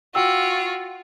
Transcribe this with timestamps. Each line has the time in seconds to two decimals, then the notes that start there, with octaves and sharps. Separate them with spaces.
0.15 F4 F#4 G5 E6